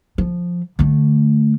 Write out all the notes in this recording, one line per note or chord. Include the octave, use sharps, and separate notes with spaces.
F3
D3 A3